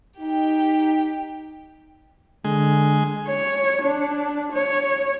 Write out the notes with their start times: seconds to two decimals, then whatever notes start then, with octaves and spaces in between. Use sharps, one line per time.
0.20 D#4 G4 G5
2.44 D3 G#3
3.27 C#5
3.82 D4
4.52 C#5